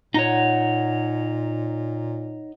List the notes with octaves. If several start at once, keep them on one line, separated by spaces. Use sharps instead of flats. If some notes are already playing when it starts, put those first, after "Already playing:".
A#2 D#4 C#5 F#5 A#5